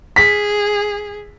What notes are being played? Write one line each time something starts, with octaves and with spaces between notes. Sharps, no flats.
G#4 B6